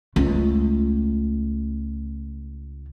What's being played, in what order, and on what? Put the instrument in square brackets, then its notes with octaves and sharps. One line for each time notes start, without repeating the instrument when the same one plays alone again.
[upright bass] C#2 A3